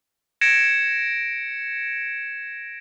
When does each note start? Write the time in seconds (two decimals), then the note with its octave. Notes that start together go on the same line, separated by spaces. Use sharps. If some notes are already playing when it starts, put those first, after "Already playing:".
0.41 G#6 A#6 C#7 D7 E7